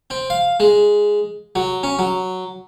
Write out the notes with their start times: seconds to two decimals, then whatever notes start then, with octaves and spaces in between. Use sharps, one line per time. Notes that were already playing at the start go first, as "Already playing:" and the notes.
0.10 C4
0.30 F5
0.60 G#3
1.55 F#3
1.83 C#4
1.99 F#3